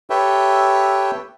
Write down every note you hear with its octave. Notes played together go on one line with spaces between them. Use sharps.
G4 A4 B4 C#5 E5 G5